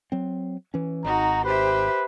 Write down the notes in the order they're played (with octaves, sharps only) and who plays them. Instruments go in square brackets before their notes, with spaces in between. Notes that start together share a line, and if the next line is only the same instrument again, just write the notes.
[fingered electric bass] F#3 C4
E3 C#4
[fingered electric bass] G#1 [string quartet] D#4 F#4 [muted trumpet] A#5
[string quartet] G4 C5 E5 [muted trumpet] B4